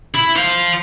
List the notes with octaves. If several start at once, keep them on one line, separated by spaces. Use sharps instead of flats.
E4
C5 F5